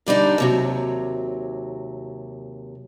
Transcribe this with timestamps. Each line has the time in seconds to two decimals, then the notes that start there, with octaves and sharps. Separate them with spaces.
0.06 D3 G3 D4 D#4
0.38 D#2 C3 F#3